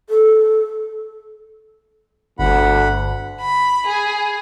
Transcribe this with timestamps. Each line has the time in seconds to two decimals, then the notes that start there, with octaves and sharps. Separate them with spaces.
0.10 A4
2.39 G1 D2 F#5 B5
3.41 B5
3.87 G#4